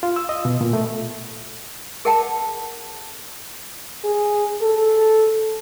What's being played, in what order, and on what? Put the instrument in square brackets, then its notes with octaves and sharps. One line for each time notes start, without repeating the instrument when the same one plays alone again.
[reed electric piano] F4
E6
D#5
B2
A#2
A3
[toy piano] G#4 A#4 E5 F#5 G5 A5
[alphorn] G#4
A4